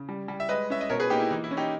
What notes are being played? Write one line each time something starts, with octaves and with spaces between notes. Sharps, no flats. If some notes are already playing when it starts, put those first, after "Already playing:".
Already playing: C#3
G3
G3
E5
G#3 B4 D#5
C#4 E5
D#5
B2 A#4 C#5
G#4 B4
A#3 D#4 G4
E4
E3 D#4
E4
C#4
D#4 G4